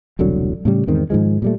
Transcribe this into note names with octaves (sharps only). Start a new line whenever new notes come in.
E1 C2 D3 F#3
A2 C#3 G3
E2 G#2 D#3 C4
G#2 D#3 F3 G#3
A#2 G3 A3